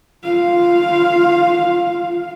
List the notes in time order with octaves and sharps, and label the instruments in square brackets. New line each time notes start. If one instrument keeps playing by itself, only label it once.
[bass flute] F4 [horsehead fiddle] F5